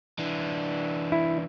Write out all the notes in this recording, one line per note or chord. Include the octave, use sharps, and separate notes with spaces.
E3 D4
E4